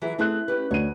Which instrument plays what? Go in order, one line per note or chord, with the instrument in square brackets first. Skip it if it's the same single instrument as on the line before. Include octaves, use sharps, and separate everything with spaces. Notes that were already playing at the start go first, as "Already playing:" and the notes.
[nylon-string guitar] E3 F#3 G#4
[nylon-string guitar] A3 C4 G#4 [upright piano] E4 F#6
[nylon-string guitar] C#4 G4 B4
[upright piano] D2 D#7 [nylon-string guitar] C#5